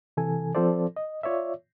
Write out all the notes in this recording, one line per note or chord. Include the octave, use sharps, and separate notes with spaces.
C3 E3 A4 G#5
F3 C4 F4 A4 C5 D5
D#5
F4 C#5 D5 E5